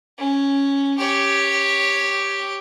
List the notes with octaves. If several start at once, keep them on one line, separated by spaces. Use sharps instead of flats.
C#4
G4 C#5